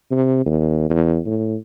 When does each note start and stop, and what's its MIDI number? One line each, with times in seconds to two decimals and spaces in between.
0.11 0.42 48
0.46 0.89 39
0.90 1.19 40
1.26 1.56 45